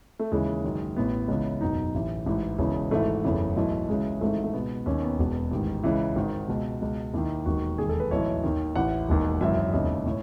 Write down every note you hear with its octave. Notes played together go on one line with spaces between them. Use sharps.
A3
D#2 C#3 E3 G#3
F#1 F#2 D#3
A1 A2 E3 B3
C#2 C#3 E3
F#1 E2 B2 D#4
A1 A2 E3
A1 G#2 E3
E1 E2 C#3 E3
G#1 G#2 E3 A3
F#1 E2 C#3 E3
B1 A2 E3
C#2 C#3 E3 G#3
G#1 G#2 E3 A3
A3
C#2 B2 B3
D#2 D#3 C#4
B3
E1 E2 B2
A1 G#2 D#3
C#2 C#3 E3
G#1 G#2 D#3
C#2 B2
C#2 B2
D#2 D#3 E4
E1 D#2 D#3 F#4
E1 D#2 D#3 G#4
A4
B4
B1 A2 E3 C#5
D#2 D#3
A1 A2 E3 F#5
E1 D#2 D#3
G#1 F#2 C#3 E3 E5
E1 D#2 C#3 E3 D#5
A2 C#5